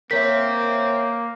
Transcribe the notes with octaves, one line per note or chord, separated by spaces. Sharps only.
A#3 C4 A#4 C#5 E5 B6